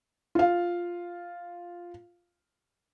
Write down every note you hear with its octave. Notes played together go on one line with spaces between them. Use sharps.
F4 F5